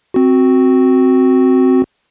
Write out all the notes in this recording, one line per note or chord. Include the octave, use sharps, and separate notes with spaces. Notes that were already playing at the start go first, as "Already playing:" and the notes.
C4 F#4